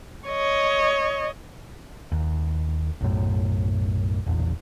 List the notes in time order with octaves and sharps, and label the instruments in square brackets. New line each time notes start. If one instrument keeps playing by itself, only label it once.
[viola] C#5 D#5
[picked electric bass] D#2
B1 F#2 A2
E1 A#1 E2